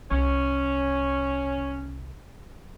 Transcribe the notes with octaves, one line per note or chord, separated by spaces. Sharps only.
C2 C#4